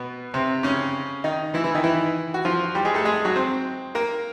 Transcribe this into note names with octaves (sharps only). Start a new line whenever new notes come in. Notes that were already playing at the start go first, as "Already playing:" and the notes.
Already playing: B2 B3
C3 C4
C#3 C#4
D#3 D#4
E3 E4
E3 E4
D#3 D#4
E3 E4
F#4
F3 F4
G3 G4
G#3 G#4
A3 A4
G#3 G#4
F#3 F#4
C4 C5
A#3 A#4